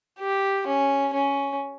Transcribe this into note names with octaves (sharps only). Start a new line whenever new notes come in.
G4
C#4
C#4